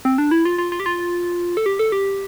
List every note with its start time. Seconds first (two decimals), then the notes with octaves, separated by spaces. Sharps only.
0.05 C4
0.18 D4
0.31 E4
0.45 F4
0.58 F4
0.72 F4
0.80 G4
0.86 F4
1.57 A4
1.66 G4
1.79 A4
1.92 G4